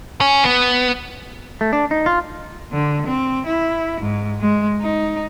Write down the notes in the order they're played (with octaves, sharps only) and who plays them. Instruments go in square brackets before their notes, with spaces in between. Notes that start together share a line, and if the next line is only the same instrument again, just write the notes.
[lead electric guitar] C#4
B3
[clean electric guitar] A3
D4
D#4
F4
[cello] D3
C4
E4
G#2
G#3
D#4